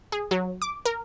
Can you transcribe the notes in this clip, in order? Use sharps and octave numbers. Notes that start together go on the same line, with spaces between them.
G#4
F#3
D6
A#4